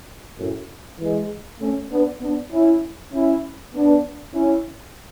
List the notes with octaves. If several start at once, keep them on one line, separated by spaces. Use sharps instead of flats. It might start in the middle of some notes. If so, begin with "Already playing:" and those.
F#2 A2
E3 G#3
A3 C#4
B3 D4
B3 D4
C#4 E4
C#4 E4
B3 D4
C#4 E4